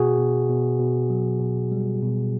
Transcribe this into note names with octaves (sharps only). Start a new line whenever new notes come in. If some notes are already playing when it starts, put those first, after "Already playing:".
Already playing: B2 F#4 G#4
B2
B2
B2
F#3
B2
G3
B2